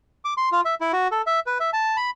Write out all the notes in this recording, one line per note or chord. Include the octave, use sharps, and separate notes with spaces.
D6
C6
F4
E5
E4
F#4
A4
E5
B4
E5
A5
B5